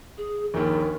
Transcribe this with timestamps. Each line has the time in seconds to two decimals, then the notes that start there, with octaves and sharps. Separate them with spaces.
0.18 G#4
0.54 A#1 D#2 A#4